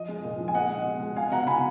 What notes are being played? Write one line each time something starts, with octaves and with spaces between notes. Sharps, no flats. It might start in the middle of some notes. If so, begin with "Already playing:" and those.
Already playing: F3 D#5
G#3
A#2
F3
G#5
G#3 D#5 F#5
G#3
B2
G#3
G#3 F5 G#5
B2 F#5 A#5
B2 G#5 B5